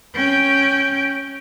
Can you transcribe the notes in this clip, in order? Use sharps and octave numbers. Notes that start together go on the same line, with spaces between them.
C#4 G5